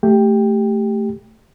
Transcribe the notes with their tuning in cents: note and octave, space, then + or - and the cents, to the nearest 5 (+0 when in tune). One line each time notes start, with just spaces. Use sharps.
A3 +0 G4 +0 G5 +10